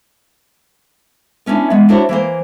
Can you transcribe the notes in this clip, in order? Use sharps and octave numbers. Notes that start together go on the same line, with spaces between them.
B3 C#4 D4 E4
G#3 B3
D4 E4 F#4 C5 C#5
E3 A#3 C5